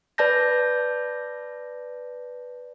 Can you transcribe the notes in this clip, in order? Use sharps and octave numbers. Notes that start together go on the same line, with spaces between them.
B4 D5 A5 G6 A#6